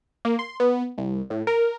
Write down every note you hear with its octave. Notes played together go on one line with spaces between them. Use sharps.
A#3
C6
B3
C2
A2
A#4